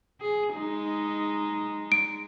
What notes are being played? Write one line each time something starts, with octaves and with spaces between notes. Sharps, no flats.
G#4
G#3 D#4
D7